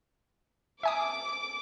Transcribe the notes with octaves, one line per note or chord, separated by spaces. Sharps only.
E5 G#5 D6 D#6